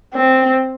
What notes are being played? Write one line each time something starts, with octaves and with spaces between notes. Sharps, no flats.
C4